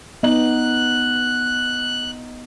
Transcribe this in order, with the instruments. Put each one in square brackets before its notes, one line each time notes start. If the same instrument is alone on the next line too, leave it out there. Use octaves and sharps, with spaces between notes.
[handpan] B3 [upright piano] D#4 F#7 [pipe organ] F#6